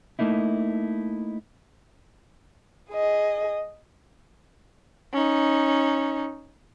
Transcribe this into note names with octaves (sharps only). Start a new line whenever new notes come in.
A3 A#3 D#4 E4
G#4 D#5
C#4 D#4